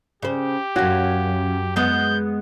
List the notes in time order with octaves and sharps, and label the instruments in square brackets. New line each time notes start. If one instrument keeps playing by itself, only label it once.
[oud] C#3 C5 [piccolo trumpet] G4
[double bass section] F#2 [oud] C#4 F4 [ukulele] F#4
[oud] G#3 B3 [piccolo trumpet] G6